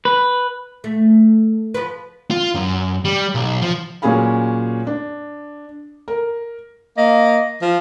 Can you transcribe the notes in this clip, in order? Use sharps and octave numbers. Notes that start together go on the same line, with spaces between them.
B4
A3
F3 B4
F4
F#2
G3
B1
F3
A#2 F#3 C#4 G#4 F5 B5
D4
A#4
A#3 D#5
F3